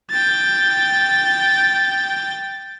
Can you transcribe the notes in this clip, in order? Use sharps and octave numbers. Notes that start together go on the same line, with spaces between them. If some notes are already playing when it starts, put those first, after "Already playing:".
G5 A6